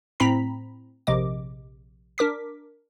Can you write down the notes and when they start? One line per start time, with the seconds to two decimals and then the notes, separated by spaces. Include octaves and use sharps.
0.20 A2 C4 A#5 B5 B6
1.07 A#1 C3 D#5 D6
2.18 D4 A#4 D6 B6